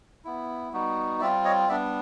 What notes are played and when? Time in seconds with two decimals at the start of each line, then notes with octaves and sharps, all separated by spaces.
0.25 B3 E4
0.73 G3 B3 D#4 F#4
1.21 G3 C4 F4 D5 E5
1.45 C#5 D#5
1.69 G3 B3 D4 D5 E5